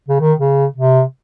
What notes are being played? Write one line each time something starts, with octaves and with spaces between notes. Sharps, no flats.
C#3
D#3
C#3
C3